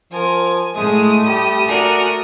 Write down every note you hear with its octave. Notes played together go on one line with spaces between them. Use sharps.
F3 A#4 G#5
A2 G#3 A3 D#6
G3 G4
F#4 A#4 D5 G#5